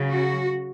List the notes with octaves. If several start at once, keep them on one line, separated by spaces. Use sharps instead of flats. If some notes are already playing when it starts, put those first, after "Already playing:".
Already playing: C#3 F#3
F#4